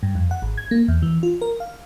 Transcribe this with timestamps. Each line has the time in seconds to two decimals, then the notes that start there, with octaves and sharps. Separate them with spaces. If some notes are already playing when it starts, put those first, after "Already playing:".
0.03 G2
0.15 F2
0.31 F#5
0.42 G#1
0.58 G#6
0.71 A#3
0.88 E2
1.02 E3
1.23 F4
1.41 A#4
1.60 F5